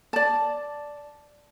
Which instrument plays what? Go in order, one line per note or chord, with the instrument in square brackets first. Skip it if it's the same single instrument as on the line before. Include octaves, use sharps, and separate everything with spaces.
[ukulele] D5 A5